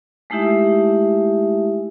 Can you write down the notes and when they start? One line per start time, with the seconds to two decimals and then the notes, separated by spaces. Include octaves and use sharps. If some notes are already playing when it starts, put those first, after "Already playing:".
0.30 G#3 A3 D#4 E4 G4 E5